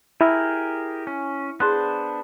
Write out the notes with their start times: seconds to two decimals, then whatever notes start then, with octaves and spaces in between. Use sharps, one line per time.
0.21 E4 G4 G#4 A#4
1.07 C#4
1.60 B3 D4 G#4 C5 C6 F#6